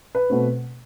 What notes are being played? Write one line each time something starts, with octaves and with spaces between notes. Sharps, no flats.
B4
B2 A3 C4